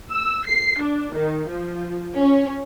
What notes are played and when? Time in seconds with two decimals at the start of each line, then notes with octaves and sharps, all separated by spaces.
0.13 E6
0.46 C7
0.81 D4
1.14 D#3
1.48 F3
2.17 C#4